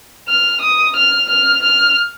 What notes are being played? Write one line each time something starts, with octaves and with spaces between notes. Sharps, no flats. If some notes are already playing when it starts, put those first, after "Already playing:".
F6
D#6
F6
F6
F6